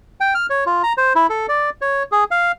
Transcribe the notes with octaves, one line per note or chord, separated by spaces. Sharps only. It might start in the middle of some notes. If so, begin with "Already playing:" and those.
G5
F6
C#5
F4
A#5
C5
E4
A4
D5
C#5
G#4
F5